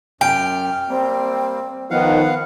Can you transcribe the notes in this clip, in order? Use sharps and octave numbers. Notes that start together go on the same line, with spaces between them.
F#2 G5 F6
G3 A#3 C4
D#3 F3 B3 F5 F#5